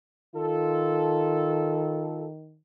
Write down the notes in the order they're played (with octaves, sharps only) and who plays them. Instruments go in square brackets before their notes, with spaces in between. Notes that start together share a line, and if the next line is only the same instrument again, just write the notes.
[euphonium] D#3 [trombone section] F4 A4